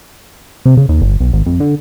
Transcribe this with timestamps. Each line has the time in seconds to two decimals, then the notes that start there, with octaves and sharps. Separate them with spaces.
0.66 C3
0.77 C#3
0.89 D#2
1.02 G1
1.20 B1
1.33 G#1
1.46 F2
1.60 D3